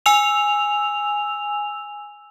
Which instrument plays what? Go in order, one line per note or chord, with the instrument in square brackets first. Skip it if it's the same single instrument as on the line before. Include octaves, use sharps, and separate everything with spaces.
[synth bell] G#5 E6 F7